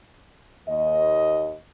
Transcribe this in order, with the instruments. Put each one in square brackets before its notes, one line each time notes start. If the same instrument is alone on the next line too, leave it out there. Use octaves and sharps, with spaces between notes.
[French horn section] D#2 D#5